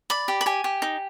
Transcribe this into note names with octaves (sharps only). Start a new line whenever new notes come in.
D5 B5
G4
B5
G4 G#5
G4
D#4